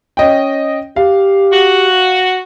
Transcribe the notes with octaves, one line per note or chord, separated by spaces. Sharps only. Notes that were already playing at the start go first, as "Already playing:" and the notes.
C#4 D#5 G5
G4 F5
F#4